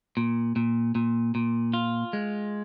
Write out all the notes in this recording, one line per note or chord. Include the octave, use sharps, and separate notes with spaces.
A#2
A#2
A#2
A#2
F4
G#3